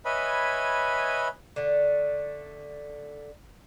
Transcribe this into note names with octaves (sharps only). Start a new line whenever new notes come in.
B4 C#5 D#5 E5 G#5 B5
D3 A3